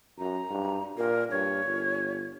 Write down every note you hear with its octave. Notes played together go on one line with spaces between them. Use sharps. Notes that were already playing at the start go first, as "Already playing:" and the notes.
F#2 A#5
G2
A#2 A#4
G2 C#5
G1